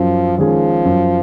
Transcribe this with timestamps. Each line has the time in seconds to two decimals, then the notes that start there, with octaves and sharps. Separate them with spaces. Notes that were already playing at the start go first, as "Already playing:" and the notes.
Already playing: F#2 F3
0.38 D#3 F3 G#3 C#4 G#4
0.85 F#2